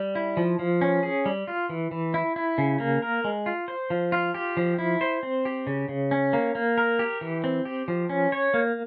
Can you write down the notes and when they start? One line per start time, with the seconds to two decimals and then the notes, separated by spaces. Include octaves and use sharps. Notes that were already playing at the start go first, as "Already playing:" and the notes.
Already playing: G3
0.15 E4
0.37 F3
0.59 F3
0.81 C#4
1.03 G#4
1.26 G3
1.48 F4
1.69 E3
1.91 E3
2.14 E4
2.36 E4
2.58 C#3
2.80 A#3
3.02 A#4
3.24 G#3
3.46 F4
3.68 C5
3.90 F3
4.12 F4
4.34 G4
4.57 F3
4.78 E4
5.01 C5
5.23 C4
5.45 G4
5.67 C#3
5.89 C#3
6.11 C#4
6.33 A#3
6.55 A#3
6.78 A#4
6.99 G4
7.21 E3
7.44 C4
7.65 G4
7.88 F3
8.09 C#4
8.32 C#5
8.54 A#3